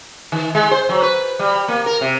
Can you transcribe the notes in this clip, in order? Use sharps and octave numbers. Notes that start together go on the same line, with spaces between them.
D#3
G#3
C5
F#3
B4
G3
A#3
A#4
C3